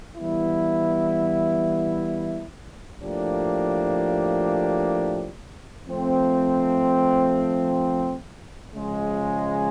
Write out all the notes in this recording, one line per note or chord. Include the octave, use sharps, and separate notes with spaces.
E3 G3 B3 E4
A2 F3 A#3 D4 G4
F3 A3 C4
C#3 F3 G#3